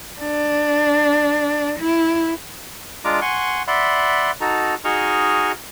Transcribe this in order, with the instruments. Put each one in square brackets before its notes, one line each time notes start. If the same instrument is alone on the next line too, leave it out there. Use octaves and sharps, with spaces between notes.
[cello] D4
E4
[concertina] G#3 D4 F4 A#5 D6
F#5 G#5 C6 C#6
D5 E5 F#5 B5 C6
D#4 F#4 A4 A#5
D#4 F#4 G#4 D#5 C#6 F6